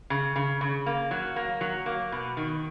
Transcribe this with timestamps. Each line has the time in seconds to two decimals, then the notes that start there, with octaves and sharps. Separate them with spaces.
0.10 C#3
0.36 C#3
0.61 C#3
0.86 A#3
1.11 F#3
1.36 A#3
1.61 F#3
1.86 A#3
2.12 B2
2.37 D#3